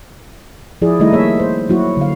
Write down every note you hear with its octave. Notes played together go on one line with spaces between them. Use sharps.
F3 E4 G#4 D5
D#3 G3 A3 D#4 E4 D#5
A#3 G#4 C#5 E5
C5
F#3 A#3 E4 F#4
D3 F5